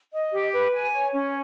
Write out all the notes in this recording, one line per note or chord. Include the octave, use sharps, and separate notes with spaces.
D#5
G4
B4
G#5
C#5
C#4